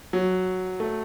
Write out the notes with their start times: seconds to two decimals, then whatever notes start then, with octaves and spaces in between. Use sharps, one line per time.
0.13 F#3
0.80 A3